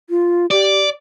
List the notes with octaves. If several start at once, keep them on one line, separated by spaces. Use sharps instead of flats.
F4
G4 D5